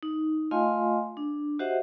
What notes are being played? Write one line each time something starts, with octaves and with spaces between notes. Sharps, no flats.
D#4
A3 F4 D#5 F5 G#5 C6
D4
F#4 G4 C5 D#5 E5 F#5